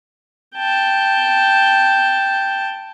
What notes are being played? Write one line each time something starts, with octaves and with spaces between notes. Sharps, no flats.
G5 A5